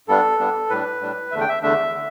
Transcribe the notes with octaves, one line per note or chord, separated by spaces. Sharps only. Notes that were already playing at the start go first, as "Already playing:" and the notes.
G2 G3 B3 D4 A4
G2 G3 B3 D4
A2 G3 D4 B4
A2 G3 D4
E2 D3 A3 D4 E5
G5
E5
E2 D3 A3 D4 E5
D3